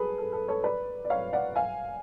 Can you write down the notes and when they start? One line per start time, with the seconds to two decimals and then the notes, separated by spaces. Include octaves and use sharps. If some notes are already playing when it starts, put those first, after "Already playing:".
Already playing: G#4 A4 B4
0.18 A4
0.32 A4
0.48 A4 C#5
0.64 B4 D5
1.05 D5
1.10 C#5 F5
1.33 D5 F#5
1.55 F5 G#5